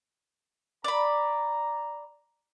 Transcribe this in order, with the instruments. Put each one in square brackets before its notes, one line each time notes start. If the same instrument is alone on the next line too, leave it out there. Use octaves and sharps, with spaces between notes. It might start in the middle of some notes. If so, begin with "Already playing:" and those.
[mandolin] D5 B5 [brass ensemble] A#5